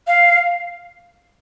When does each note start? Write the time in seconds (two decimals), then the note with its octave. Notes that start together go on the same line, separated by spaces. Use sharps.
0.07 F5